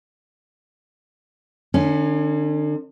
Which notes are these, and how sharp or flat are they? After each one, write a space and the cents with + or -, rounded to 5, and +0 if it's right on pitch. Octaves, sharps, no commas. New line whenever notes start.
D3 +45 C#4 +5